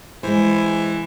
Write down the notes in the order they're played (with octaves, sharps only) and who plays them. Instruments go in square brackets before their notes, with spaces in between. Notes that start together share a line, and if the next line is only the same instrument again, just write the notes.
[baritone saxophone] E3 [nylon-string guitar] G#3 C5